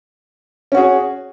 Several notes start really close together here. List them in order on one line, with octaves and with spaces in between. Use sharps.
C#4 F#4 G#4